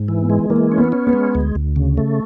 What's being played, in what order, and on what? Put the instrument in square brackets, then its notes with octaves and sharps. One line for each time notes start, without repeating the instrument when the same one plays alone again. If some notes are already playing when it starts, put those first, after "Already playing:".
Already playing: [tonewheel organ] G#2
E3
[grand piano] B3
[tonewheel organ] G#3
[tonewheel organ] E3 [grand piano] A#3
[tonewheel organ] C#4
[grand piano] B3
[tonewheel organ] C#4
[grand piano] B3
[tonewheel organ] G#3
D2
D2
C#3
A3